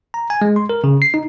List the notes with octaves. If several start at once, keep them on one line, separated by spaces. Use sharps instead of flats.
A#5
G#5
G#3
C6
A#4
C#3
C7
D#4